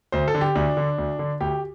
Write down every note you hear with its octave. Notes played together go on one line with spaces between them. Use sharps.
D2 C5
A4
D3
G4
D2 D4
D3
D2
D3
D2 G4